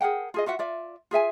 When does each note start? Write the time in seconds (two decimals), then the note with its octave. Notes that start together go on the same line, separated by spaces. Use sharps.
0.01 G#4 A#4 F#5 G5
0.34 F4 G#4 D#5
0.46 F4 F#4 E5 F#5
0.59 F4 D5 E5
1.11 F4 G#4 E5 G#5